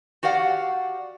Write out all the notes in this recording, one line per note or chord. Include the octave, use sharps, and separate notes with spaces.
F#4 G4 D5 F5 F#5